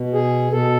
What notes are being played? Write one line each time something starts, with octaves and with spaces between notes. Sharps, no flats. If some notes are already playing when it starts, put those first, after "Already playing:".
Already playing: B2
G#4
B2 A4